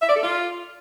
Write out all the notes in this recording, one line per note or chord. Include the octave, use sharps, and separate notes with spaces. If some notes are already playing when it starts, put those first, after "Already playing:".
E5
D5
A4
F4